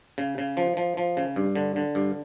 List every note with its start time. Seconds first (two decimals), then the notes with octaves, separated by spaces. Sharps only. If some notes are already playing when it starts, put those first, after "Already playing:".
0.18 C#3
0.38 C#3
0.57 F3
0.77 F3
0.97 F3
1.17 C#3
1.36 G2
1.55 D3
1.76 D3
1.95 G2